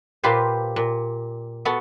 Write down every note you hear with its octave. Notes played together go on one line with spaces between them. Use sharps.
A#2 F4 G4 B4 C5
A#2
B3 F#4 A4